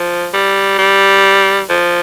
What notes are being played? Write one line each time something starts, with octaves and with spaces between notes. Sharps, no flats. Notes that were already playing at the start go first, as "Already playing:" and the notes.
Already playing: F3
G3
G3
F3